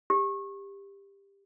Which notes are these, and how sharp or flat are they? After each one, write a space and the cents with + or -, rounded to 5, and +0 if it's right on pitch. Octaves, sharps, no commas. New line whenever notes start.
G4 +20